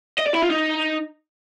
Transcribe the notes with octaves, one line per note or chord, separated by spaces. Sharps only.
D#5
D5
E4
F4
D#4